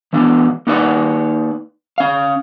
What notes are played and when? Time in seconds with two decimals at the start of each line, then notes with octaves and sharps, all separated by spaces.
0.13 E3 B3 D4
0.67 A#3 D#4 B4 D5 F#5
1.98 C#4 F5